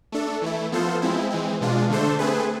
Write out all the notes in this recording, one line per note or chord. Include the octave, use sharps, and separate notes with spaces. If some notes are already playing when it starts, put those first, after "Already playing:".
A3 D4 A4
E3 A3 E4
F3 B3 F4 A4 C5
F3 G#3 C4 E4
E3 G#3 C4
B2 G#3 D4 F4
D3 A3 D4 A4 C5
A3 C4 G#4 B4